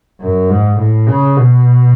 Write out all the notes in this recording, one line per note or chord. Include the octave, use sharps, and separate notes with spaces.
F#2
G#2
A2
C#3
B2